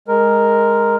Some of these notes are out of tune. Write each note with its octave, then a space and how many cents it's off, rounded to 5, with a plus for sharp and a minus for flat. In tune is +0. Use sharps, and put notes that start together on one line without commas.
G#3 +0 A#4 +0